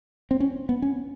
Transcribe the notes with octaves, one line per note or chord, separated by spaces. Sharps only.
C4
C#4
B3
C#4